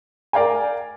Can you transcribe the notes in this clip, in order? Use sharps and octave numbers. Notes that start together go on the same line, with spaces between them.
A#4 D5 F5 G5 G#5